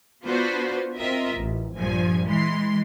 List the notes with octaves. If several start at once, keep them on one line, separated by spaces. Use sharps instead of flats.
B3 D4 F4 F#4 B4 C5
C4 F4 A#4 D#5 E5
A1
A#1 G2 F3 G#5
E3 G#3 C6